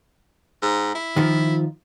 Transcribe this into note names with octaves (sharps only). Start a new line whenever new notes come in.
G#2
E4
D#3 F3 F4